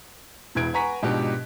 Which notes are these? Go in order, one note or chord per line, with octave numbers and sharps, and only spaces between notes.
E1 E2 E4 G#6 D7
B4 F#5 G#5 A#5 C#6 B6
G#2 B2 F3 D4 G4